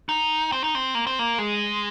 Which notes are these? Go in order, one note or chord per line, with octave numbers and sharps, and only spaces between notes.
D#4
C4
D#4
C4
A#3
C4
A#3
G#3